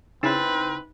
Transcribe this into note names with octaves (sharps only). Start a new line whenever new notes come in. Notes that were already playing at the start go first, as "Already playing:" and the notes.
C#3 C4 D#4 E4 B4